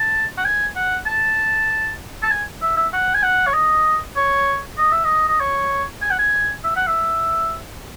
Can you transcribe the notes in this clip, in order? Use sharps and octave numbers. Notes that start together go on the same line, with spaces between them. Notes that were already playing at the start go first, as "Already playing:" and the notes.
Already playing: A5
F#5
G#5
F#5
A5
A5
G#5
E5
E5
F#5
G#5
F#5
C#5
D#5
C#5
D#5
E5
D#5
D#5
C#5
G#5
F#5
G#5
E5
F#5
E5